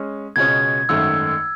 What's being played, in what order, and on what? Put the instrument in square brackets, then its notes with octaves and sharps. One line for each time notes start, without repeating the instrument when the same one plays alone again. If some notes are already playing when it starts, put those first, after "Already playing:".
Already playing: [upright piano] G#3 C#4
[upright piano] C#2 B2 G#3 C#4 [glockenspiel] G#6
[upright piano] G#1 F#2 D#3 A3 [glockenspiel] E6